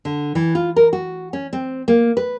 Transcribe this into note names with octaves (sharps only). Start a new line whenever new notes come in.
D3
E3
F4
A#4
F#4
C#4
C4
A#3
B4